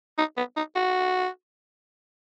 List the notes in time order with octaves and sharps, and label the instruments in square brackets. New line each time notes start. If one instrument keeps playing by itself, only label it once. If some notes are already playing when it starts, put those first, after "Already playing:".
[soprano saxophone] D#4
B3
D#4
F#4